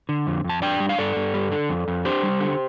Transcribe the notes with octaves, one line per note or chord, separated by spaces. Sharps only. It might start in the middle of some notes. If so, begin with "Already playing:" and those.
D3
F2
F2
A5
D4 D5 G5
G3
F5
G2 A4 D5
G2
G3
D3
F2
F2
D4 G4 C5
G3
D3